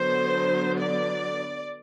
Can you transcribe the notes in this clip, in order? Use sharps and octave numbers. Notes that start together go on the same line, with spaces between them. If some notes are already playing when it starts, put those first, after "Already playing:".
Already playing: D3 F#3 B3 C5
D5